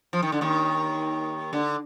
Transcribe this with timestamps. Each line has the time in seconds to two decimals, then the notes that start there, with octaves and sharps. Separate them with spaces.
0.13 F3
0.23 D#3
0.32 D3
0.41 D#2 D#3
1.53 D3